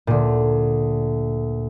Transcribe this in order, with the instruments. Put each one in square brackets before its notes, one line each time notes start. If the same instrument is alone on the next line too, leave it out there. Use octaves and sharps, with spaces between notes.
[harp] D2 A#2